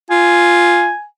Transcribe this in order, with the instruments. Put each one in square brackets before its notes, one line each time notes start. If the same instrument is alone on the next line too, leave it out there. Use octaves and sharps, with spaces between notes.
[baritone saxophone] F4 [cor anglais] G#5